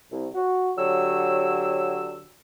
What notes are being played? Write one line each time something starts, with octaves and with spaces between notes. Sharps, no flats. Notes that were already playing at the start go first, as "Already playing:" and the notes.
C2
F#4
D3 F#3 G4 C#5 E6